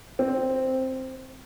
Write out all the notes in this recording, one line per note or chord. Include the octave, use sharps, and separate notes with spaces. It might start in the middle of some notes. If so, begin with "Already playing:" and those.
C4